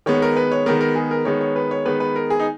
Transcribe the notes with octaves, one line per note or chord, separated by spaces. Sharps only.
D#3 G#3 B3 C#5
A#4
B4
C#5
D#3 G#3 B3 A#4
A#4
G#4
A#4
D#3 G#3 B3 C#5
C#5
B4
C#5
D#3 G#3 B3 B4
B4
A#4
G#4
D#4